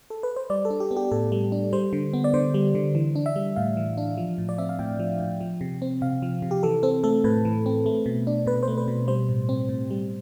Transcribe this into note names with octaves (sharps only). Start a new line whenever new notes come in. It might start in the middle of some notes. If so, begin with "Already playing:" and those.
A4
B4
C5
G3 D5
A4
D4
G4
B3
G4
A2 A4
G3
D4
G3 C5
D3
B3
D5
D3 C5
G3
D3
E3
D4
E5
G3
A2 F5
E3
D4
F3
A2
D5
C4 E5
F5
A2 G5
F3
A2
F3
C3
C4
C3 F5
F3
C3
G4
E3 A4
C4 A4
A3 A4
A2 B4
E3
C4
A3
B2
D4
B2 B4
A3 C5
B4
B2
G3 C5
A2
C4
A2
G3